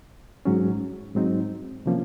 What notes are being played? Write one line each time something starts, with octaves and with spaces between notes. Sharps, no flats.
G#2 F#3 C#4
G#2 F#3 C4 D#4
C3 F3 A#3 C#4